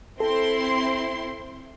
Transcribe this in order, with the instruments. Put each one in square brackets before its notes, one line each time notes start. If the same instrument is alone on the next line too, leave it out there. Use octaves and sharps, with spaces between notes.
[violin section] C4 E4 C6 [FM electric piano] A4